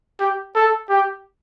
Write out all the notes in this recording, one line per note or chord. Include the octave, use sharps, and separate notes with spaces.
G4
A4
G4